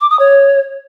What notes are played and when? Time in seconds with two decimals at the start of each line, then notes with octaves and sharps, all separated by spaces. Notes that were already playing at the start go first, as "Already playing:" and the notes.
0.01 D6
0.10 D#6
0.19 C#5